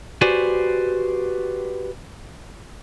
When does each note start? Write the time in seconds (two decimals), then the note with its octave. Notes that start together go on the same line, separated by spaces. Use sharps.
0.21 F#4 G4 B4 C5 D5 G#5